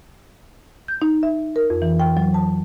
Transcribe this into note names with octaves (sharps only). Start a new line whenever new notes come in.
G6
D#4
E5
A#4
F2
E3
G5
F#3
A5